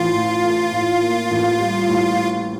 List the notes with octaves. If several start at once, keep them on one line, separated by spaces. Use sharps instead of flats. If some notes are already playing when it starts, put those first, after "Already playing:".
Already playing: A1 A2 E3 A3 F4
A2
A3
A2
A#3
A1
G3
A2